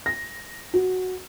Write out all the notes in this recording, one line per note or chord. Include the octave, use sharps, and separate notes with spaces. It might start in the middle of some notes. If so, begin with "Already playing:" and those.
A#6
F#4